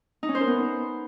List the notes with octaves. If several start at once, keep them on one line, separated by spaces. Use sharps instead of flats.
D#4
C#4
C5
A#4
B3